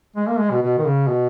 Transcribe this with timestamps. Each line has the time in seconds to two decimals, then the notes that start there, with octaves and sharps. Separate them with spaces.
0.16 G#3
0.27 A#3
0.39 G#3
0.51 B2
0.62 B2
0.78 D#3
0.85 C#3
1.08 B2